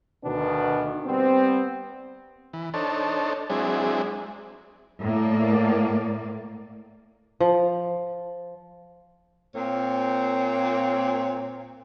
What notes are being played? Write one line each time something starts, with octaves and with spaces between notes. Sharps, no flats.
D2 B2 D#3 B3 D4
G3 B3 C4
E3
D4 D#4 A4 C5 C#5 A5
F#3 G#3 C4 D4 E4 G#4
A2 A#3 D5
F3
A#2 A#3 C4 C#5